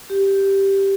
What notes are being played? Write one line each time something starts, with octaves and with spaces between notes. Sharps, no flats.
G4